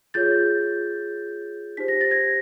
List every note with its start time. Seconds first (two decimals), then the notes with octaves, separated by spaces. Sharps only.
0.14 F4 G#4 C#5 G6 A6
1.77 D#4 G4 C5 B6
1.88 A#6
2.01 A6
2.11 G#6 A#6